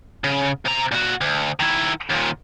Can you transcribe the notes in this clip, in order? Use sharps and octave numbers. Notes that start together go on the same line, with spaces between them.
C#3
C3 A#5
A#2 F#4
D2
D#3 E4
D#2 A#2